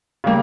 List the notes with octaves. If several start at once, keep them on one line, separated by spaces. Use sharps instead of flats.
C#3 G3 A#3